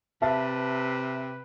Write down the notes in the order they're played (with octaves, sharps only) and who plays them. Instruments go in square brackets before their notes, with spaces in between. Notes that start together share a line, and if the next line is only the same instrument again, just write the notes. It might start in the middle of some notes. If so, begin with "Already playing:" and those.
[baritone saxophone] C3 [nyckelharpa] B4 [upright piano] E5 A5